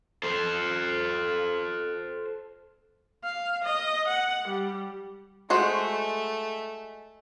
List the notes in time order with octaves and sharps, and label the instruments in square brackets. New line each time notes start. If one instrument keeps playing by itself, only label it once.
[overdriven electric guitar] A4 C5
[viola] F5
D#5
F#5
G3
[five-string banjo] G#3 F#4 C5 [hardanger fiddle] A3